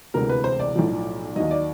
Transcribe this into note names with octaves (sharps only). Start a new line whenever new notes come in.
E1 D2 C3 E3 A#4
B4
C5
D5
B1 A2 F3
D#2 D#3 F#3 D#5
D5